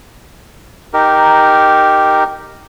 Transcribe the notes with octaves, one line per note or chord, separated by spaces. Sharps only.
D#4 G4 A#4